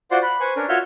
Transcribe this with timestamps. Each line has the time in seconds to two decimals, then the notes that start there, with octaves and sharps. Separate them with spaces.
0.11 F4 F#4 C5 D5 F#5 C6
0.22 B5 F#6
0.40 B4 C5 G#5 C#6
0.56 C#4 D4 A#4
0.69 F4 F#4 C#5 E5 F6 G6